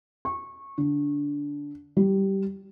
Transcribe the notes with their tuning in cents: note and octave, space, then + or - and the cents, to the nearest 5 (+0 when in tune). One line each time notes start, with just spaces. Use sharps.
C#6 -20
D3 -20
G3 -15